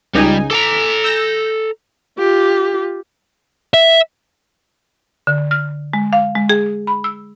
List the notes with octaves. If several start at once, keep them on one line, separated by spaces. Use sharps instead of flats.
C#2 G3 D#4 G#5
A4 A5 A#5 D6 B6
E6 G6 A#6
F4 G4
E5
D3
F6
G#3
F5
G#3
G#4
B5
E6